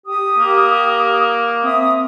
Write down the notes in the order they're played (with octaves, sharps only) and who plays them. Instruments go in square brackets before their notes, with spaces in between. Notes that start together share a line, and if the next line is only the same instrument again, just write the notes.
[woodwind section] G4 D#6
[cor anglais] A#3
[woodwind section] C4 E5 D#6